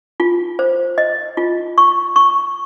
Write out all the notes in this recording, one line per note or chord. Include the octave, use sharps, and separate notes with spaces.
F4
C5
D#5
F4
C#6
C#6